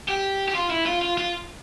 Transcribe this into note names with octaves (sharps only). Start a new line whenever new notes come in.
G4
G4
F4
E4
F4
F4
F4